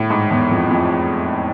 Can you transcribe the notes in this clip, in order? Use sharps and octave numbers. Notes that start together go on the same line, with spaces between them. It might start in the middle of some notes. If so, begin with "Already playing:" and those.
Already playing: A2
G#2
E2
F2
F2